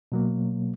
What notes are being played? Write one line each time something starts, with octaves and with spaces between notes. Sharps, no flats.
B2 F#3 A#3